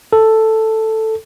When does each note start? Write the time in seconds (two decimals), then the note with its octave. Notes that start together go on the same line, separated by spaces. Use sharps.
0.13 A4